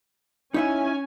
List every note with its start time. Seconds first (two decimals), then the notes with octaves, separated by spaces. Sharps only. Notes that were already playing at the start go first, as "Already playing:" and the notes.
0.54 C#4 D#4 E4 E5 G#5